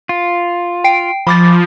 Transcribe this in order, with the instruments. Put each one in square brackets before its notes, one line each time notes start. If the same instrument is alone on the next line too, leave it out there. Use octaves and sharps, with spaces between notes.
[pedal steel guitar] F4
[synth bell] G5 C7 D7
[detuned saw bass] F3 [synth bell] B5 D6 A6